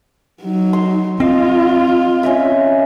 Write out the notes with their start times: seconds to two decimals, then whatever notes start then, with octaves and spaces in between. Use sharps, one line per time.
0.43 F#3 D#4
0.73 C6
1.20 C4 F4 D#5
2.23 C#4 D#5 E5